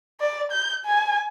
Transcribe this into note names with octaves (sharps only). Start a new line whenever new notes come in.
D5
G6
G#5